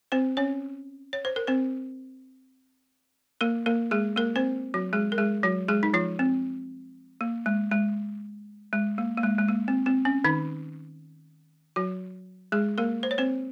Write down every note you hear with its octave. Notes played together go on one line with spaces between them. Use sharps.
C4 C5
C#4 C#5
C#5
C5
A#4
C4 C5
A#3 A#4
A#3 A#4
G#3 G#4
A#3 A#4
C4 C5
F#3 F#4
G#3 G#4
A#4
G#3 G#4
F#3 F#4
G#3 G#4
D#4
F3 F4
C4
A#3
G#3
G#3
G#3
A#3
A#3
G#3
G#3
A#3
C4
C4
C#4
D#3 D#4
F#3 F#4
G#3 G#4
A#3 A#4
C5
C#5
C4 C5